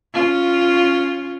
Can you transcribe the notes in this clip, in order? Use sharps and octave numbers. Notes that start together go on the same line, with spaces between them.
C#4 F4